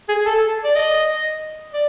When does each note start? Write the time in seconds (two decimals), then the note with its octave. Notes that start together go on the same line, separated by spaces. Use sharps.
0.09 G#4
0.26 A4
0.64 D5
0.75 D#5
1.73 D5